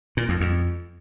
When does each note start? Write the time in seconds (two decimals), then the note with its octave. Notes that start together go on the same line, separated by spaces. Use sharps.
0.17 A#2
0.29 F2
0.41 F2